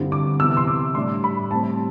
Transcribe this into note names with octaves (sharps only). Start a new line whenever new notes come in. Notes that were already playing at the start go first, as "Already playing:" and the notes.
Already playing: G2 D3 G3 C4 E4
D6
C3 E3 B3 E6
C6
D6
A2 G3 D4 C6
B5
A2 G3 C4 A5